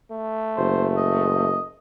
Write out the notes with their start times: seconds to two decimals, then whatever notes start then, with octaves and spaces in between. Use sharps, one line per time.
0.12 A3
0.57 F#1 C5
0.97 D#5